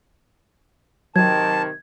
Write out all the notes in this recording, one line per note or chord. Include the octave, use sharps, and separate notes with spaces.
C3 D#3 F#3 A5 G#6